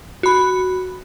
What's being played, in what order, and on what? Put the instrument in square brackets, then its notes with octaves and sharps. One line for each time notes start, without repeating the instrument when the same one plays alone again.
[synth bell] F#4 B5